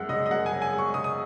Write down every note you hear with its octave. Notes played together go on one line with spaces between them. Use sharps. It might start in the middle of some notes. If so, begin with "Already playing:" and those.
Already playing: F#2 G#3 F#5
C#3 D#5
D#5
F#2 F#5
G#5
C#3
G#5
G#3
C#6
C#3 D#6
D#6